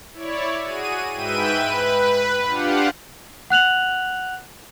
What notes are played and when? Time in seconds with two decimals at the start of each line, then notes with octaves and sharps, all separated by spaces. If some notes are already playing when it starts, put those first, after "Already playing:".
0.13 E4 C#5 D5
0.63 F#4 G#4 D#7
1.13 G#2 B4 E5 G5 D#7
1.55 B4
2.46 D4 F4 G4 F5 F#5
3.50 F#5 F#6 F7 F#7